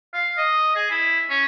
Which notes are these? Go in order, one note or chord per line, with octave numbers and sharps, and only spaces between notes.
F5
D#5
G#4
E4
C#4